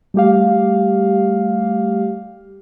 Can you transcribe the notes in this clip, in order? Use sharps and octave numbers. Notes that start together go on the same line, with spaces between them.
G3 A3 G4 F5